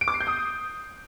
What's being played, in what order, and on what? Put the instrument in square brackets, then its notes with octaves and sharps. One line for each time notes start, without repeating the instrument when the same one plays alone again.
[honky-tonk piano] D7
D6
C7
G6
D#6